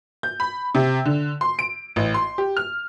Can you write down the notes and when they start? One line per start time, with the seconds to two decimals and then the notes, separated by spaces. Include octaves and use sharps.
0.23 G6
0.40 B5
0.75 C3
1.06 D3
1.41 C6
1.59 D7
1.96 A1
2.14 C6
2.38 G4
2.57 F6